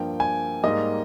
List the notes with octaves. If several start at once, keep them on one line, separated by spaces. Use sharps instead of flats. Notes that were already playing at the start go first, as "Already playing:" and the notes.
Already playing: G2 F3 A#3 G5
G#5
G#2 G3 A#3 D#5